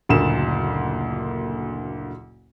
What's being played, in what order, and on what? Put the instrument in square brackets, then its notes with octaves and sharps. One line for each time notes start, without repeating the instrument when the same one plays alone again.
[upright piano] F#1 D2 A#2 D3 A#3 E7